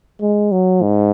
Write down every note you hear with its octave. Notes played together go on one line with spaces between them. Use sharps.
G#3
F#3
G#2